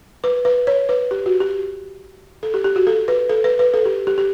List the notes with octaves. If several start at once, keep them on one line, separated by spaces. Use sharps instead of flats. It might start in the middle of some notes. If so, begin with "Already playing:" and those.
B4
B4
C#5
B4
G4
F#4
G4
A4
G4
G4
F#4
A4
B4
A4
B4
B4
A4
G4
G4
G4